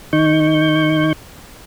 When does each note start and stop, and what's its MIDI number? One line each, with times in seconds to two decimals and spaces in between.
0.13 1.13 51
0.13 1.13 63
0.13 1.13 85
0.13 1.13 91